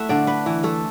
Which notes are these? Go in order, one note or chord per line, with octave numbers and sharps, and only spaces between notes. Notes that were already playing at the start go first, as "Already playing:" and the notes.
Already playing: A3 E4 E5 F#5
D3 D5
D4 B4
E3
A3 A4